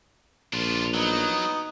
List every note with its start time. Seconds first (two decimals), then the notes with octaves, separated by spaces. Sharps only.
0.53 A#1 D4 F4
0.94 F#3 B3 D#4